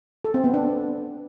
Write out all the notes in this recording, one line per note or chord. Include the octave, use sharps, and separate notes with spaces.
A4
C4
B3
D4